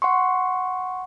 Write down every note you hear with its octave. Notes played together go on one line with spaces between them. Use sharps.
F#5 C6 C#6